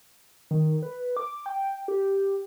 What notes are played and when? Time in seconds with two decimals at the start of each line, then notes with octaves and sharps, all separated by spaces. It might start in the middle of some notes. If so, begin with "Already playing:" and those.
0.51 D#3
0.83 B4
1.17 D6
1.46 G5
1.88 G4